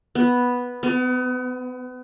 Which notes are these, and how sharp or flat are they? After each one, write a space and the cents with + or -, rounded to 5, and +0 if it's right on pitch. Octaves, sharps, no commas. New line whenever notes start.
B3 -5
B3 +35